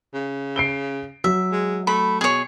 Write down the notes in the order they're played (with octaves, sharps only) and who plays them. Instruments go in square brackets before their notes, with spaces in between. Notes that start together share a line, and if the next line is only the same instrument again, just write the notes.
[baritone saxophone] C#3
[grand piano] C7 D7 G7
[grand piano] F#3 [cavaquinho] E5
[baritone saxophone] G#3
[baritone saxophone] A3 [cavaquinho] B5
[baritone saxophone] B2 [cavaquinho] G#4 C#5